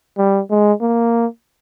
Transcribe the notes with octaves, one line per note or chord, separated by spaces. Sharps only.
G3
G#3
A#3